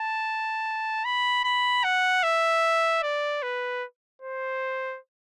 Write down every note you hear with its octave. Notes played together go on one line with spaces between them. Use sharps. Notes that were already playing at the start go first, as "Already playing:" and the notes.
Already playing: A5
B5
B5
F#5
E5
D5
B4
C5